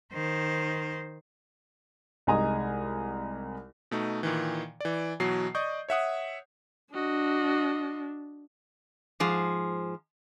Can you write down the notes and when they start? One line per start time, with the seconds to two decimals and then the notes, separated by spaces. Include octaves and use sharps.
0.12 D#3 C5
2.27 C2 G#3 D#4 G#5 A#5 D#6
3.91 B2 A3 D#4
4.23 A#2 D#3 E3
4.81 E3 D5
5.20 B2 E3 F#3 C7
5.55 D5 D#5 C#6 D#6 G6
5.89 C#5 E5 F#5 D#6
6.94 D4 F#4 D#5
9.20 G#2 F3 G#4